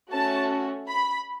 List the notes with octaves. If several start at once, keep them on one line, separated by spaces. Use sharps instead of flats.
A3 C#4 F#4 A5
B5